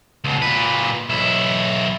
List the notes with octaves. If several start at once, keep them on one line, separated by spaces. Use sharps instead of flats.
C#2 B2
A#2 B4
B1 E4